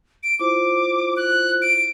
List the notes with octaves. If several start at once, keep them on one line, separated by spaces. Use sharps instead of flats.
D7
E4 F4 C5 D6
F#6
D7